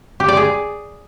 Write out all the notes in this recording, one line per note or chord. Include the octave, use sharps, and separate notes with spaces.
G4
D5
G#4